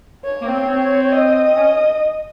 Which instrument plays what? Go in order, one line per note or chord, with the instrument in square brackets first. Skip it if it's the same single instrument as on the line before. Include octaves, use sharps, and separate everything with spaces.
[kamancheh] C#5
[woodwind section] A#3
C4
C4
[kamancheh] D#5
[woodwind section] C#4